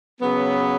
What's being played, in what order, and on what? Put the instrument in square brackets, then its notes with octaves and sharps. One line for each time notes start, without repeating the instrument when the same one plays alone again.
[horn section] C#3 F#3 B3